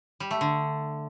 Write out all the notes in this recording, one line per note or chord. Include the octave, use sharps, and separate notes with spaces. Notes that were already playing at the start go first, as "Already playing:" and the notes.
G3
A3
D3